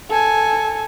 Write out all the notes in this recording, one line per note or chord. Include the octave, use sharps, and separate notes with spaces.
A4 G#5